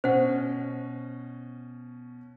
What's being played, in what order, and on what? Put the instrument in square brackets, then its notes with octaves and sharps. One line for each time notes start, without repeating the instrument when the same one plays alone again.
[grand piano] B2 C#4 [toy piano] C5 F#5